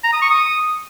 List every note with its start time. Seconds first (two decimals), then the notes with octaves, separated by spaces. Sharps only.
0.04 A#5
0.13 D#6
0.22 C#6
0.31 D#6